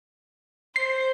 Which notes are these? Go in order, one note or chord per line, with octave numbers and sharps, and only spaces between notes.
C5 C7